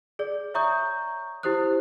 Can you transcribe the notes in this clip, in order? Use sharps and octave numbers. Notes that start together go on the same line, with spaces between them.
G#4 D5
C#5 E5 A#5 C#6 D#6 G6
E4 G4 C5 D#6 F#6